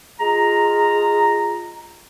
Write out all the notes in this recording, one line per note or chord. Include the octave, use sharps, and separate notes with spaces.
G#3 F4 A#5